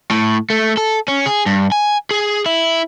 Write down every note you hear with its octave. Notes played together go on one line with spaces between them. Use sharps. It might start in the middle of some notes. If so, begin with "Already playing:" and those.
A2
A3
A4
C#4
G#4
G2
G#5
G#4
E4